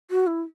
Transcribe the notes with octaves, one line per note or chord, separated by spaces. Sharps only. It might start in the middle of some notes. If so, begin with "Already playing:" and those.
F#4
E4